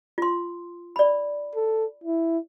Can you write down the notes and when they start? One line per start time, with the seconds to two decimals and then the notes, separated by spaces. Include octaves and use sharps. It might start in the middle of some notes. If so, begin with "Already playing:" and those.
0.18 F4 C6
0.96 D5 B5
1.55 A4
2.04 E4